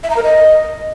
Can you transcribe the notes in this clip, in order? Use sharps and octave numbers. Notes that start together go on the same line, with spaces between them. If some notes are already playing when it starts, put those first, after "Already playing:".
E5
A#5
A#4
D#5